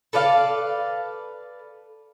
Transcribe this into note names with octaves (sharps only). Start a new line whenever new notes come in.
A4 B4 D5 F5